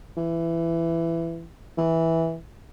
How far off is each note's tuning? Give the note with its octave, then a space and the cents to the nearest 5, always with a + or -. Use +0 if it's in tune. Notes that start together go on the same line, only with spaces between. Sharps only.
E3 +15
E3 -10